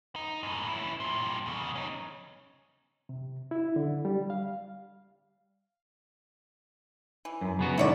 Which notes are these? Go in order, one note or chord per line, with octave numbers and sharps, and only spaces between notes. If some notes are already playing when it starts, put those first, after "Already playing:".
D#4
F#2 A2
C#4 E4
G2 A#2
E2 C#3
C#4 D#4
C3
E4
D3
G3
F5
E3
F#2
C#3 B3 F#4
G#2 D3 D#3 E4 C#5 D5